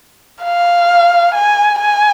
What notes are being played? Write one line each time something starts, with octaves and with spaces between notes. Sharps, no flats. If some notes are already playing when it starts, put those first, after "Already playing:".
F5
G#5
G#5